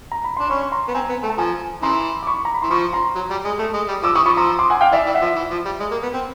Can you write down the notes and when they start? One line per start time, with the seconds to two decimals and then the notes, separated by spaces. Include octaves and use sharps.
0.12 A#5
0.24 B5
0.37 D4 C6
0.50 C#4 B5 C#6
0.62 C#6
0.72 A#5 C6
0.89 B3
0.94 C4 G#5 A#5
1.09 B3
1.23 A3
1.30 A5
1.38 F3 G#5 A#5
1.82 C#3 E3 A#5 C6
2.23 D6
2.27 B5 C#6
2.45 A#5
2.54 B5
2.62 E3 C6
2.71 F3 B5 C#6
2.93 A#5 C6
3.16 F#3
3.31 G3
3.45 G#3
3.59 A3
3.74 G#3
3.89 G3
4.03 F3 D6 E6
4.15 E3 C#6 D#6
4.26 F3 B5 C#6
4.37 F3 A#5 C6
4.59 C6 D6
4.70 F#5 G#5
4.81 F5 G5
4.92 E3 D5 E5
5.07 E3
5.14 E5 F#5
5.22 F3
5.36 E3
5.51 F3
5.66 G3
5.80 G#3
5.91 A#3
6.03 B3
6.14 C4